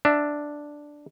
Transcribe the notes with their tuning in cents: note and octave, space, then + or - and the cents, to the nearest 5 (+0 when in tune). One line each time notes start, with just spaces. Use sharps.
D4 +0 E5 +5